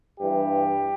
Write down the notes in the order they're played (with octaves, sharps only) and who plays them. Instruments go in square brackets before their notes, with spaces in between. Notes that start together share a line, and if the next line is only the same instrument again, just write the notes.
[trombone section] G2 E3 G4